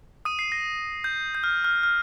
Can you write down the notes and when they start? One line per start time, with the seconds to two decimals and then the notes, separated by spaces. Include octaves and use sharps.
0.25 D#6 D#7
0.39 C7
0.52 A#6
1.04 G6
1.35 G6
1.44 F6
1.64 F6
1.83 F6